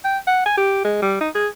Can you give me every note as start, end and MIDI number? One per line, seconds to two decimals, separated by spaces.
0.04 0.18 79
0.27 0.44 78
0.46 0.52 80
0.57 0.82 67
0.84 0.97 56
1.02 1.16 55
1.21 1.29 63
1.35 1.48 68